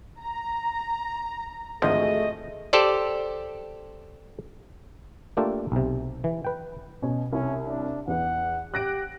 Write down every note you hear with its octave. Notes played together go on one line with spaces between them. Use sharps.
A#5
G#1 D2 F3 A3 G#4 D#5
G4 A4 C5 D5
A3 A#3 D4 F4 G4 A4
B1 C3
E3
B4 G5
B2 C#4
C2 C#4
D4
E2 B4 F#5
G4 F#6 A#6 D7